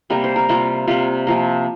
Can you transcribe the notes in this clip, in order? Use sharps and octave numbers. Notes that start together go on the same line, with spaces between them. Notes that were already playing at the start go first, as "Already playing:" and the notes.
C3 G3 A#3 A#4
C5
A#4
C3 G3 A#3 F4
C3 G3 A#3 F4
C3 F3 A#3